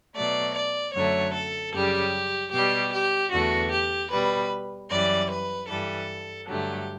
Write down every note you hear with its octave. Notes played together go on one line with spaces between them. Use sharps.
B2 F#3 A3 D5
D5
F#2 D3 F#3 A3 C#5
A4
F#2 C#3 G3 G4
B2 G3 G4
G4
E2 D3 A3 F#4
G4
B2 G3 B4
F#2 E3 G3 D5
B4
G2 E3 G3 A4
G2 D3 F#3 A3 G4